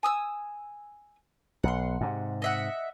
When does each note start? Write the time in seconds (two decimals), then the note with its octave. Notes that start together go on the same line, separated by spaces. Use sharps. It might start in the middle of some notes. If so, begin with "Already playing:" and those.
0.03 G#5 D#6 E6
1.64 B1 F#5 C6
2.01 G#2 C3
2.42 D#5 E5 F#5